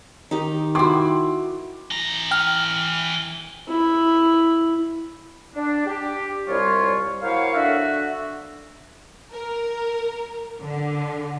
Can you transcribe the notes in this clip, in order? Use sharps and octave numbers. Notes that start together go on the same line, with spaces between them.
D#3 D#4 G4
E4 F#4 G5 C6 D6
E3 A#5
G5 F6
E4
D4
G4
C2 G3 F4 C#5
F#3 A#3 E4 C5 C#5 F5
D3 D4 F#4 E5
A#4
D3